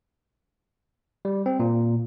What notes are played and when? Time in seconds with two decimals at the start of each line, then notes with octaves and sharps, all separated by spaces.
1.25 G3
1.46 C4
1.59 A#2